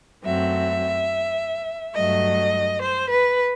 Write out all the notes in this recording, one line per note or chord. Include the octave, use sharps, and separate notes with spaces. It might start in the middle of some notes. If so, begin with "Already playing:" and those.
F#2 F#3 A3 C4 E5
G2 F#3 A3 D#5
C5
B4